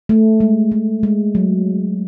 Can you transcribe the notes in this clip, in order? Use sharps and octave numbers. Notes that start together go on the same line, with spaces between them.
A3
G#3
A3
G#3
F#3